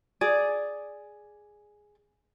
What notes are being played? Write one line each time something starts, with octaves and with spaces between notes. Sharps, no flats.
G#4 D5